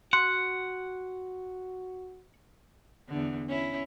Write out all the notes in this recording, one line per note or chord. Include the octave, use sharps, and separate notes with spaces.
F#4 F#5 C6
E2 D3
C#4 E4